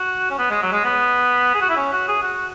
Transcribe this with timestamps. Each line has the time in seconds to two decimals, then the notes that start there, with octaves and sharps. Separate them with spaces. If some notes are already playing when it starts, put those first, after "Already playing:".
Already playing: F#4
0.31 C#4
0.38 B3
0.50 G#3
0.62 F#3
0.72 G#3
0.84 B3
1.54 G#4
1.61 F#4
1.70 E4
1.77 C#4
1.93 F#4
2.08 G#4
2.23 F#4